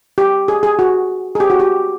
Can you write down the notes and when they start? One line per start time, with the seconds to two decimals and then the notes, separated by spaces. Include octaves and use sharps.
0.18 G4
0.48 G#4
0.63 G#4
0.79 F#4
1.35 G#4
1.40 G4
1.50 F#4
1.60 G4